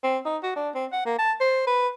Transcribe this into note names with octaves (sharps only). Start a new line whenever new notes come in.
C4
D#4
F#4
D4
C4
F#5
A#3
A5
C5
B4